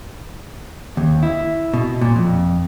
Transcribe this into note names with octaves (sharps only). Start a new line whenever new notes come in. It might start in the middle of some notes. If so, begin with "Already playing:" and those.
D#2
E4
B2
A#2
F2